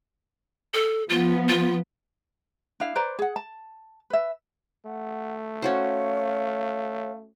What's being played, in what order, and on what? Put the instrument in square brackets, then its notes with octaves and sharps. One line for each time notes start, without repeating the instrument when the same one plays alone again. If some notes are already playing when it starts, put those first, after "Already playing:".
[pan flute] A4
[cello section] F3 B3 [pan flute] F4
[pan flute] F4
[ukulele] D4 E4 F5
B4 C5 D5 A#5
G#4 F#5
A5
B4 E5
[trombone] A3 [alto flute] F#5
[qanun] C#4 F#4 C5 [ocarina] C#5 [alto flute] F5